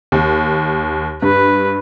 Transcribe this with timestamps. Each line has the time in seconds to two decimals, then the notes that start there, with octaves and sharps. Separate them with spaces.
0.12 D#2
1.22 G2 B4